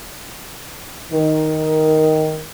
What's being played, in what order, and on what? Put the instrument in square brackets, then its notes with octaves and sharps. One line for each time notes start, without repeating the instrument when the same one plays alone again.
[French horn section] D#3